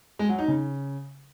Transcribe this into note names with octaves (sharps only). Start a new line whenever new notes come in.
G#3
F#3
D#4
C#3